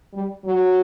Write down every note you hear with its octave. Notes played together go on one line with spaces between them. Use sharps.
G3
F#3